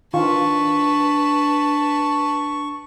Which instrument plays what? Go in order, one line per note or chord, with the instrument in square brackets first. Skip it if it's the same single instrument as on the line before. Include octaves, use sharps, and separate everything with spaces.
[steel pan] D#3 F4 [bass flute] D4 [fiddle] B4 A5 [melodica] C#6